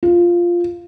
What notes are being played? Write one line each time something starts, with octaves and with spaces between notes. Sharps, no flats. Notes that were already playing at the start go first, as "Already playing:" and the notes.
F4